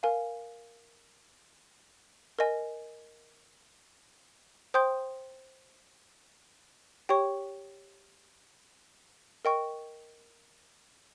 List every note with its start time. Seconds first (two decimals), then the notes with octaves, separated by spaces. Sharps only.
0.03 A#4 F5 G#5
2.39 A#4 D#5 G#5
4.74 C5 G5 C6 D#6 G6
7.09 G4 C#5 G5 C#6
9.45 A#4 D#5 G5 C#6